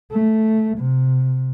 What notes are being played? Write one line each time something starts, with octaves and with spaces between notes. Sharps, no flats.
A3
C3